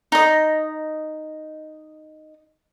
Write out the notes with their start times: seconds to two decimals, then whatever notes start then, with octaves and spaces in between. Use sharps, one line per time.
0.12 D#4 D#5